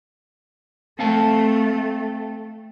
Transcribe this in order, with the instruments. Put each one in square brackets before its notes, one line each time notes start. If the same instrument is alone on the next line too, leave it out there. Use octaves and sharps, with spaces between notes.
[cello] A3 [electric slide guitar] C4 F5 A5